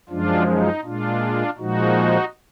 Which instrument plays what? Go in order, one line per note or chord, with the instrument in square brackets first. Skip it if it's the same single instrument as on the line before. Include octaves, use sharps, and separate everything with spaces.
[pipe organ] F#2 F3 G#3 D4 F4
D#4
A#2 G#3 D4 F4
A#2 F3 G#3 D#4 F#4